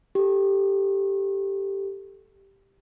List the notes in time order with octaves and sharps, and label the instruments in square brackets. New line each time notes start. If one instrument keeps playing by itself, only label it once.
[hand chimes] G4 A4